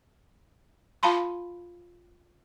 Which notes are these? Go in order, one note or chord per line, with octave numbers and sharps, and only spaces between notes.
F4 F5 A5 B5 C6